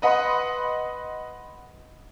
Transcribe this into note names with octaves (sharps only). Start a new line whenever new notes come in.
B4 D#5 F#5 B5 C6